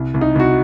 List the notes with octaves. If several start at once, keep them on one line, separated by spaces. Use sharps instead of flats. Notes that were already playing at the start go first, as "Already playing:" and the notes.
Already playing: C2
C2
D#4
C2 F#4